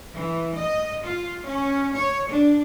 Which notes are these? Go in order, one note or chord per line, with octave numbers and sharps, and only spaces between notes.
E3
D#5
F4
C#4
C#5
D4